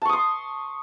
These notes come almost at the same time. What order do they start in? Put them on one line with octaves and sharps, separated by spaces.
A5 C#6 D#6 C6